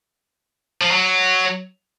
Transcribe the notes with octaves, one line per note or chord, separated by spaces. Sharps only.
F3
F#3